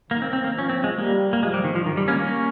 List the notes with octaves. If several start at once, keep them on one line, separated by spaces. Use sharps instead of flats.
D#3 A#3
C4
C4
A#3
F3 C#4
C4
G#3
G3 A#3
A#3
F3 G#3
G3
D#3
F3
G2 D#3
G3
A#3 C#4
A#3 C#4